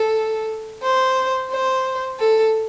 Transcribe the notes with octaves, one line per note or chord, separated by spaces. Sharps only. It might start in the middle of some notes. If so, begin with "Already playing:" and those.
Already playing: A4
C5
C5
A4